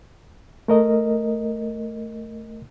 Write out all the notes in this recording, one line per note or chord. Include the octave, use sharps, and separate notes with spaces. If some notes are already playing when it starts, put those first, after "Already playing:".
A3 A#4 D#5